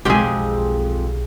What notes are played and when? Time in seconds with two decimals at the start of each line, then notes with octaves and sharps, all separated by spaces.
0.05 B1 F2 G#3 C4 G4 G#4